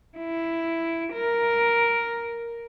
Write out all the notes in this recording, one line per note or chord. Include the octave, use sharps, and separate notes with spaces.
E4
A#4